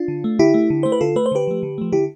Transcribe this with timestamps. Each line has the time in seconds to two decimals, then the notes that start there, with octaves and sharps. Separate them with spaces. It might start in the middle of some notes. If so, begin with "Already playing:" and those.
Already playing: D4 F4
0.08 D3
0.24 A3
0.39 D3 E4 G4
0.54 A3
0.70 D3
0.83 A3 C5
0.92 B4
1.01 D3 F4 A4
1.16 A3 B4
1.26 C5
1.32 D3 G4 B4
1.47 F3 A3
1.63 D3
1.78 F3 A3
1.92 D3 E4 G4